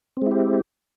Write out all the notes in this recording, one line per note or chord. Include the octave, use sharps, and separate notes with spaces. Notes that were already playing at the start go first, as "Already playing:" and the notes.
G#3 C4 E4 G4